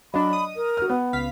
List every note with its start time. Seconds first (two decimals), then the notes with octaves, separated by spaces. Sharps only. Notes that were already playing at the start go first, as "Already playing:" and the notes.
0.14 F#3 D4 D#5 B5
0.33 D#6
0.56 A#4
0.77 F#4 F6
0.89 B3 F#5
1.13 C#2 F5 B6